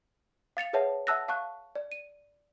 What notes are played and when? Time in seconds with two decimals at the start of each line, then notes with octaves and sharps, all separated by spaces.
0.57 F5 A6 C#7 F7
0.73 G#4 B4 C#5 E5 F#5 A5
1.07 E5 F#5 A5 E6 F#6 A#6
1.28 F5 A5 C#6 F#6
1.75 D5
1.92 D#7